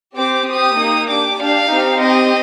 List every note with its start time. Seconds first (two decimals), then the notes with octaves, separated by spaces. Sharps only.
0.16 C4 G4 D6
0.46 C4 G4 D#6
0.77 A#3 D#4 G4
1.08 D4 G4 D6
1.39 D4 G4 F5
1.69 C4 D#4 G4
1.99 C4 G4 D#5